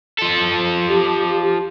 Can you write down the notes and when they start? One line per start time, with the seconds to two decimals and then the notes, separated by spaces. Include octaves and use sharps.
0.19 F3 A4
0.88 G4